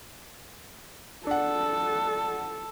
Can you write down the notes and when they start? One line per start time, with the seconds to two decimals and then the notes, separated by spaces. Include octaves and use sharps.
1.27 D4 A4 F#5